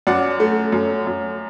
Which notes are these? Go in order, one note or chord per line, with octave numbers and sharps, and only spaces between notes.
F#2 D5 F#5
A3
F#2
F#2